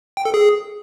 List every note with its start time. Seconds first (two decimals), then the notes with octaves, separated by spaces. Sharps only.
0.17 G5
0.25 A4
0.34 G#4